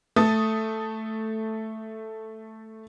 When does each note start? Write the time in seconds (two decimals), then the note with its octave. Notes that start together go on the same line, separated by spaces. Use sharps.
0.16 A3 A4 D#6 A6